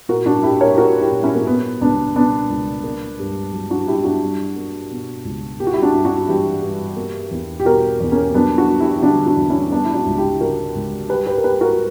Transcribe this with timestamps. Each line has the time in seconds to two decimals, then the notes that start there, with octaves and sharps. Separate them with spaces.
0.09 A#2 F#4 A#4
0.26 D4 F#4
0.43 A#3 E4 G4
0.61 A#4 C#5
0.74 G4
0.77 A#3 F#4 A#4
1.01 E4 G4
1.12 A#2
1.23 C#4 E4
1.35 A#3
1.47 A#3 B3
1.81 C#2 B3 D4
2.16 B2 B3 D4
2.49 C#2
2.84 A#3
3.19 G2
3.52 F#3
3.70 D4 F#4
3.87 G2 E4 G4
4.04 D4 F#4
4.22 G3
4.56 A#3
4.91 B2
5.25 C#2
5.60 A#3 G4
5.67 F#4
5.73 E4 G4
5.82 D4 F#4
5.94 G2
6.05 D4 F#4
6.28 E3 E4 G4
6.62 G2
6.96 A#3
7.31 E2
7.60 G4
7.65 B2 F#4 A#4
8.00 E2
8.12 A#3 C#4
8.34 F#3 B3 D4
8.57 D4 F#4
8.69 A#3
8.80 E4 G4
8.96 G4
9.03 D3 D4 F#4
9.26 D4 F#4
9.37 E2
9.49 C#4 E4
9.72 G3 B3 D4
9.85 E4
9.94 D4 F#4
10.06 C#2
10.17 E4 G4
10.40 C#3 F#4 A#4
10.75 C#2
11.09 G3 G4 B4
11.26 G4 B4
11.38 A#4
11.44 A#3 G4 B4
11.61 F#4 A#4